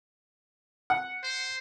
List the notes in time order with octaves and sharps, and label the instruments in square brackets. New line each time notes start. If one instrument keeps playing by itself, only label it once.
[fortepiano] F#5
[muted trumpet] C5